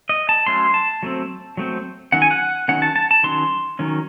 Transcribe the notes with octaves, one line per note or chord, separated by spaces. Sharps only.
D#5
A5
F#3 A3 C#4 C6
A5
F#3 A3 C4
F#3 A3 C4
D#3 F#3 C#4 F#5
G#5
F#5
D#3 F#3 C#4 F#5
A5
A5
A5
D#3 F#3 C#4 C6
D#3 F#3 C#4